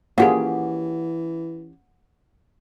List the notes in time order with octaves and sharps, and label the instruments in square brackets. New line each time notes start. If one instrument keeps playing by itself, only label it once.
[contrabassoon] E3 [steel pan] A#3 F4 G#4 [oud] C#4 G4 [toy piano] F#5